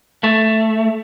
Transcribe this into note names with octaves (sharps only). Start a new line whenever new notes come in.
A3